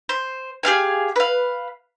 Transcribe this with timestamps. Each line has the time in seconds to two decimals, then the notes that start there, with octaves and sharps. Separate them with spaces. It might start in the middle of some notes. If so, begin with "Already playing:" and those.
0.09 C5
0.63 G4 G#4 F5 G#5
1.16 B4 F5